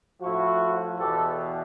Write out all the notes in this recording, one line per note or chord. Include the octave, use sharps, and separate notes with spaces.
A2 F3 E4 F#4
E2 B2 G4 A4